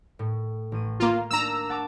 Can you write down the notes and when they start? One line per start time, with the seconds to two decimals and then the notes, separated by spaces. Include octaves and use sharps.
0.19 A2
0.72 A1 D#7
1.00 A#3 F4 A#5
1.31 A#3 D4 A#5 E6
1.69 F#5 A5 D6